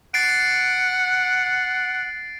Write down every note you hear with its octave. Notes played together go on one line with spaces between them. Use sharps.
F#5 A6 C7 D7